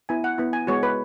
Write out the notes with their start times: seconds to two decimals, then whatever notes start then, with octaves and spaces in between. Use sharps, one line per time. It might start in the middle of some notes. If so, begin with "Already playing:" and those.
0.09 B3 E4 G#5
0.24 F#5
0.38 B3 E4
0.53 G#5
0.67 G#3 B3 F#4 C#5
0.83 B4